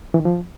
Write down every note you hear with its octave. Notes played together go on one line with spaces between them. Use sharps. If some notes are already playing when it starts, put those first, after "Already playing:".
E3
D#3
F3